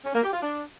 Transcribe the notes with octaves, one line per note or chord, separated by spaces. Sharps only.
C#4
A#3
G4
F4
D4